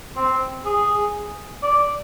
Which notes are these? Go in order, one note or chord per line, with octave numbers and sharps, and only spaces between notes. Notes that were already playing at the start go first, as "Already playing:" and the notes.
C4
G#4
D5